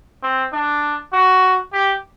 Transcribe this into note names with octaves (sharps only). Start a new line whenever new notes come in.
C4
D4
F#4
G4